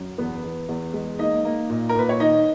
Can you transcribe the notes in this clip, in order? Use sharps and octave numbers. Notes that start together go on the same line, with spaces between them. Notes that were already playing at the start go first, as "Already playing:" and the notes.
Already playing: F#2
E2 B3 B4
E2
E2
G#3
A#3 D#4 D#5
A#3
A#2
A#4
A#2 B4
C#5
D#3 D#4 D#5